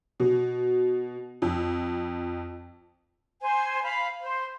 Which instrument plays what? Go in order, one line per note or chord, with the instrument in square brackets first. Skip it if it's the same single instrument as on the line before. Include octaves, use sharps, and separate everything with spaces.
[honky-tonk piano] B2
F2
[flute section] C5 G#5
F5 B5
C5